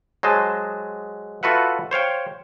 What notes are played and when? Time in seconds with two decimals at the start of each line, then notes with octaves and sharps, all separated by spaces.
0.23 F#3 G#3 C5 D#5 A5
1.43 F4 F#4 A4 B4 E5 F#5
1.91 C5 C#5 F5 G5